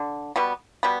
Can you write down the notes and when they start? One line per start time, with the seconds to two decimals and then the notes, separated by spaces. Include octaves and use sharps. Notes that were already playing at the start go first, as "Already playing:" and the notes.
Already playing: D3
0.36 B2 G3 B3
0.83 B2 G3 B3